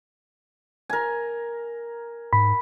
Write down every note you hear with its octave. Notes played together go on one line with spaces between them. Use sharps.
A#4 G#5
G#2 B5